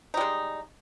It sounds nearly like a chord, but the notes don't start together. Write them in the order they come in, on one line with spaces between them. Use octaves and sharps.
D#4 G3 G#3